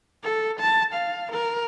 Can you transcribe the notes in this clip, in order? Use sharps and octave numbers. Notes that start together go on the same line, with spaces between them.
A4
A5
F5
A#4